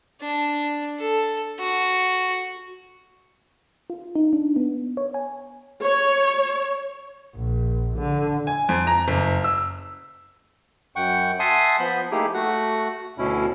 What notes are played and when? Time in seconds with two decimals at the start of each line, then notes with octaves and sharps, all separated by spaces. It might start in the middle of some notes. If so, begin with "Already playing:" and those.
0.22 D4
0.99 A4
1.59 F#4
3.90 F4
4.16 D#4
4.33 D4
4.56 B3
4.97 C#5
5.14 G#5
5.84 C#5
7.35 A#1
7.98 D3
8.47 G#5
8.69 F2
8.87 A#5
9.08 F#1
9.44 E6
10.96 F#2 F#5 G5 C#6
11.40 E5 F#5 G#5 A5 C6 D#6
11.80 F3 B3 B5 G6
12.11 A3 A#3 D#4 E4 G4 G#4
12.34 A3 F#4 F#5
13.18 D2 B2 C#4 E4